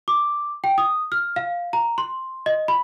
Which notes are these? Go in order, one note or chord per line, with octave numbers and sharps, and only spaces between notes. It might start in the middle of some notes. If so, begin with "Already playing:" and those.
D6
G5
D#6
F6
F5
A#5
C6
D#5
B5